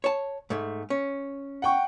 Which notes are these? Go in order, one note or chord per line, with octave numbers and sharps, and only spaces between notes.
C#5 A5
G#2 A3
C#4
F#5 G5 C#6